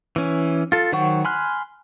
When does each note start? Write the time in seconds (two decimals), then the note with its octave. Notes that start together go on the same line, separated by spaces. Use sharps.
0.16 E3 C#4
0.72 F4 A4
0.92 D#3 F#3 C5 F#5 C#6
1.25 G#5 B5 C6 F6 F#6